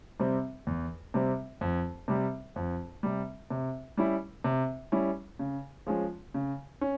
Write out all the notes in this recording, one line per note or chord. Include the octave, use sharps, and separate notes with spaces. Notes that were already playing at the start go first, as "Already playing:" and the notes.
C3 G3 C4
E2
C3 G3 C4
F2
C3 G3
F2
C3 G3
C3
G3 C#4 E4
C3
G3 C#4 E4
C#3
F3 G#3 C#4
C#3
C#4